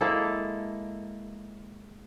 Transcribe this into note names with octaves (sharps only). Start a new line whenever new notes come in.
G#3 A#3 E4 A4